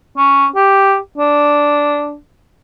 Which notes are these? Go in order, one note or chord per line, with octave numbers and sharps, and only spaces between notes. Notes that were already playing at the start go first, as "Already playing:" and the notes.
C#4
G4
D4